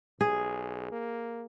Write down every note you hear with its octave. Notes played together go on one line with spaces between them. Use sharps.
B1 G#4
A#3